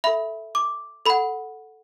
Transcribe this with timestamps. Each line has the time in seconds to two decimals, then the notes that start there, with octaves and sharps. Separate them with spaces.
0.04 A4 E5 B5
0.55 D6
1.06 A4 F#5 B5